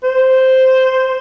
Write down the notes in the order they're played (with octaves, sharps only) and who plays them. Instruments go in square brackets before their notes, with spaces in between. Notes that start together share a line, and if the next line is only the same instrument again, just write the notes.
[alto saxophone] C5